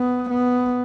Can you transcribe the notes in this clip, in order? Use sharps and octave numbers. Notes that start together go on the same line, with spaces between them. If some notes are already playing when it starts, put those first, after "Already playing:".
Already playing: B3
B3